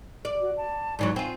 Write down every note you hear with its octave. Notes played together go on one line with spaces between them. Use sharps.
D5
F#4
A5
G#2 E3 F#3 D5
C4 F4 G#5